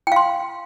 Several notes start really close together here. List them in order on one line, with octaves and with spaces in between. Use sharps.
G5 F5 C6